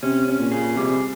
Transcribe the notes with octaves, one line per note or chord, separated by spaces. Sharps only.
C3 C#4
C#4
A#2
G#4
C3 G3